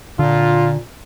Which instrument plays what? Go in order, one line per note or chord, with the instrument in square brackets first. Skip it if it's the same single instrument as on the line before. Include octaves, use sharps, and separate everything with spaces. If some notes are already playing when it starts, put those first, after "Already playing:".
[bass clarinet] A#2 [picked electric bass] D3 [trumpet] F4